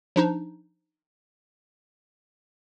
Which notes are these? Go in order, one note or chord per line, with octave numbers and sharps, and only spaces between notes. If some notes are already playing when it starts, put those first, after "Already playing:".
F3 D4 D#4